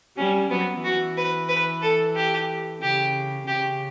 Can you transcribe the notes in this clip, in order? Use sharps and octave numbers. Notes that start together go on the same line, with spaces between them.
G3 C#4
F#3 B3
E3 F#4
B4
B4
A4
G4
C#3 G4
C#3 G4